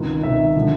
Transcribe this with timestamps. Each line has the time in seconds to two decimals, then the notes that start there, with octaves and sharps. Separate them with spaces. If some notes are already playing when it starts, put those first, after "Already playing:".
Already playing: C#2 C3 D#3
0.23 C#2 C3 D#3 E5
0.57 D3 F3